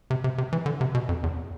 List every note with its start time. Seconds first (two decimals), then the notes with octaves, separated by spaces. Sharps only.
0.10 C3
0.24 C3
0.38 C3
0.53 E3
0.66 D3
0.81 C3
0.94 B2
1.09 F2
1.23 E2